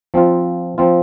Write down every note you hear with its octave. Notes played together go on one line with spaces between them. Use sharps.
F3 C4 F4
F3 C4 F4